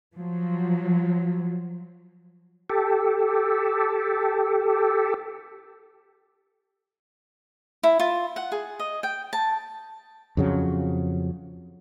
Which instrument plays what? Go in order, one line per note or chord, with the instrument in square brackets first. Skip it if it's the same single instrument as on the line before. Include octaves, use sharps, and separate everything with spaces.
[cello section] F3 F#3
[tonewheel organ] G4 A4
[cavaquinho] E4
F4
F#5
G#4
D#5
G5
A5
[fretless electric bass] F2 C#3 F#3